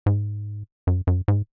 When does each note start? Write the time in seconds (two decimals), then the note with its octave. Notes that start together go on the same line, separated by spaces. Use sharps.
0.06 G#2
0.87 F#2
1.07 F#2
1.28 G#2